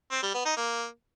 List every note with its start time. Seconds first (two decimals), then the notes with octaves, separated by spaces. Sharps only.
0.11 C4
0.23 G3
0.34 B3
0.46 D#4
0.57 A#3